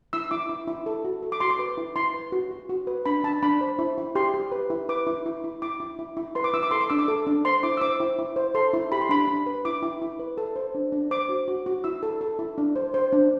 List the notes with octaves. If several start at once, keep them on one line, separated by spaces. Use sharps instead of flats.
E4 E6
E4 D6
E4
E4
A4
F#4
A4
D6
F#4 C6
D6
B4
E4
E4 C6
B4
F#4
F#4
F#4
B4
D4 B5
D4 A5
D4 B5
C5
E4
E4
G4 C6
G4
B4
E4
B4 D6
E4
E4
E4
E4 D6
E4
E4
E4
B4 C6
D6
E4 E6
D6
A4 C6
D6
D4 E6
D6
A4
D4
C5 C6
E4 D6
E6
C5 D6
E4
E4
C5
A4 C6
E4
G4 B5
C6
D4 B5
D4
B4
E4 D6
E4
E4
B4
A4
C5
D4
D4
C5 D6
F#4
F#4
F#4
E4 E6
A4
A4
E4
D4
C5
C5
D4